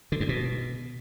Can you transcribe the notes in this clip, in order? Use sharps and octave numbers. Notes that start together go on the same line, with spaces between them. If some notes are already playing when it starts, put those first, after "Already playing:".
D3
G2
B2